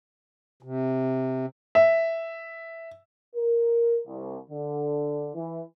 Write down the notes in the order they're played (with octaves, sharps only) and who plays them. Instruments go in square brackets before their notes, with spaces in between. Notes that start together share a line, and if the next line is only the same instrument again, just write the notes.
[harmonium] C3
[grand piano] E5
[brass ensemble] A#4
C2
D3
E3